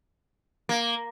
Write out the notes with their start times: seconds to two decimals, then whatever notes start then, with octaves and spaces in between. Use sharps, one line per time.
0.69 A#3